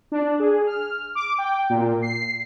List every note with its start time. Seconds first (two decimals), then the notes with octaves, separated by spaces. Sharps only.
0.12 D4
0.40 G#4
0.67 F6
1.15 D6
1.38 G5
1.70 A#2
2.02 C7